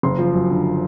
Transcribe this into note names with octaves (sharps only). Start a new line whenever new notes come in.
F#1 C6
F3
F#2
D3